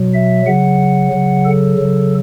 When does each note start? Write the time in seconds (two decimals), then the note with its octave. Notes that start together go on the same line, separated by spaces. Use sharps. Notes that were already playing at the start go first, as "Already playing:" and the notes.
Already playing: B2 F#3
0.14 E5
0.46 C#3 F#3 F#5
1.12 C#3 F#3
1.46 A4
1.78 C#3 F#3